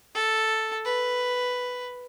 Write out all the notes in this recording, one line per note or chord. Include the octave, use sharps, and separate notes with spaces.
A4
B4